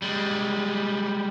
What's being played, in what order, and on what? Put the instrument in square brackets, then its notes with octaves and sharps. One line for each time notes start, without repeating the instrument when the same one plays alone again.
[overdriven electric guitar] G3 G#3